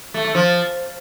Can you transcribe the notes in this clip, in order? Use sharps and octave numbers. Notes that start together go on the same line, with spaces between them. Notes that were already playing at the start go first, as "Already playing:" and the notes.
A3
A3
F3